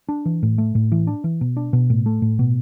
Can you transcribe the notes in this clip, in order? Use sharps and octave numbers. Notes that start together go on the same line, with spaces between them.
D4
E3
A2
A3
A2
E3
D4
E3
B2
D4
B2
A2
A3
A2
B2